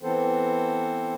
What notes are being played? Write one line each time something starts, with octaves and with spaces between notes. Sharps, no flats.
E3 B3 C4 A4 C5